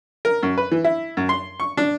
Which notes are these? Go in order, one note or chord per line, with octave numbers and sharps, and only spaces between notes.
A#4
F#2
B4
E3
E4
F#2
C6
C#6
D4